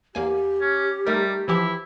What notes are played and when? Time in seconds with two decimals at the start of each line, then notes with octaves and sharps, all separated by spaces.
0.15 E2 A#3 G4 G#5
0.61 C#4
1.07 G3 A3 D#4 A#4
1.48 E3 F3 E4 G4